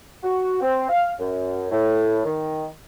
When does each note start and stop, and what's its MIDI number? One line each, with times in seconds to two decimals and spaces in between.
0.24 0.60 66
0.61 0.88 60
0.89 1.11 77
1.19 1.66 42
1.71 2.20 45
2.25 2.66 51